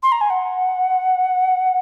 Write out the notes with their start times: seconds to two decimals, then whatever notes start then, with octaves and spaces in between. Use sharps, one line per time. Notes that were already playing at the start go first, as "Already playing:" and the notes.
0.03 C6
0.12 A#5
0.21 G#5
0.30 F#5